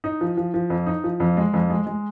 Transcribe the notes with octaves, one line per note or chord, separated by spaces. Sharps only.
D#4
F3
F3
F3
F2
D#4
F3
F2
G#3
F2
G#3
G#3